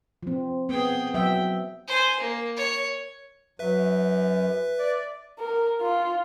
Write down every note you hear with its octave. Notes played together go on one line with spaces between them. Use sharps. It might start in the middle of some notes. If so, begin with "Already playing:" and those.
F3 C4
B3 G#4 G5
F#3 E5 G5
C5 G#5
A#3
C#5
F#2 B4 E5
D5
A#4
F4